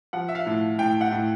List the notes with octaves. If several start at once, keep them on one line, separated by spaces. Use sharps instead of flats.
F3 F#5
E5
F5
A2
A2 G5
F#5
A2